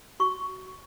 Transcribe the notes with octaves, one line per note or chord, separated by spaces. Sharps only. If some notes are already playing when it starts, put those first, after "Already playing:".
F#4 C#6